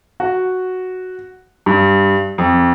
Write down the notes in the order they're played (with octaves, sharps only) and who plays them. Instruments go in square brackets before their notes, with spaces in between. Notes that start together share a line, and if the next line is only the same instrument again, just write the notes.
[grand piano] F#4
G2
F2